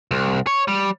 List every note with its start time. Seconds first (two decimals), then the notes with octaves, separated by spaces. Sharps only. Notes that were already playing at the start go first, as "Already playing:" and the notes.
0.11 C2
0.47 C#5
0.68 G3